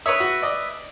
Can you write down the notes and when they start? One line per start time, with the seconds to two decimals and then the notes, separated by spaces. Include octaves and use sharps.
0.06 B4 C#5 E5 D#6
0.20 F#4
0.42 D5 D#5